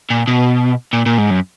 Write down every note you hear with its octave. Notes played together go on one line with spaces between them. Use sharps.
A#2
B2
A#2
A#2
G#2
F#2